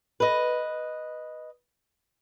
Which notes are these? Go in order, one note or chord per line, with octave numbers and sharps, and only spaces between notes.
B4 D#5